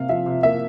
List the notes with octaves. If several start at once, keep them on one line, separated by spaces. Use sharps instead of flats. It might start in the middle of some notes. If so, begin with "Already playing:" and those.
Already playing: C3 A#3 F5
F3 E5
C3
A#3 E5